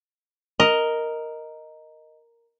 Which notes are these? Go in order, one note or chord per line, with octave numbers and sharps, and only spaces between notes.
A#4 D#5